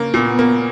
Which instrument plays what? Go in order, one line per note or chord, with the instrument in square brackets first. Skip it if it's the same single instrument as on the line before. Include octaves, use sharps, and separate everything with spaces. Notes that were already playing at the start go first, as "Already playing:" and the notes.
Already playing: [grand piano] C#3 A#3
[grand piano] A#2 [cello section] B3
[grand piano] A#3